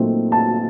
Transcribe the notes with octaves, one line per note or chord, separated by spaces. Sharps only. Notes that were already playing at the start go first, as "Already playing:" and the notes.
Already playing: A#2 F#3 A3 C4 D#4
A5